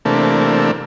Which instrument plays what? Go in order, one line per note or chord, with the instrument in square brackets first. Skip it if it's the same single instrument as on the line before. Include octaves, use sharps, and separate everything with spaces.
[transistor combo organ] C3 E3 A3 A#3 D4